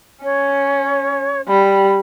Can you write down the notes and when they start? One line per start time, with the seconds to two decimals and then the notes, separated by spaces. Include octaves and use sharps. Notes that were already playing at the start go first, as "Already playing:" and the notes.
0.24 C#4 C#5
1.48 G3 B5